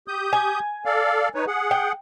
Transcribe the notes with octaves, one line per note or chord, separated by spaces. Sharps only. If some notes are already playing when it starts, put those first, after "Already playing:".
G4 D#6 G6
G#5
A4 D5 F5
D#4 B4 C#5
G#4 F#5
G5